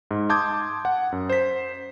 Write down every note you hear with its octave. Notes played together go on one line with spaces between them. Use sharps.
G#2
A5 C6 D6 D#6 G6 G#6
F#5
F#2
C5 B6